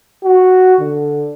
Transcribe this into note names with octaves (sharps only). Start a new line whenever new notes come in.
F#4
D3